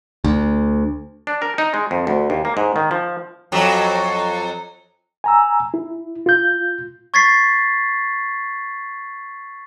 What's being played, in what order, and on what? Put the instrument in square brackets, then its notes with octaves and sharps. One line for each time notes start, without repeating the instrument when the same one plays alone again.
[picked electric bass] D2
[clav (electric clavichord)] D4
A#4
D#4
G#3
F2
D2
D#2
A#3
G#2
D#3
F3
[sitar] F2 F#3
[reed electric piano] G#5 A#5 E6
E4
F4 G6
[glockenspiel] C#6 G#6 A6 B6 C7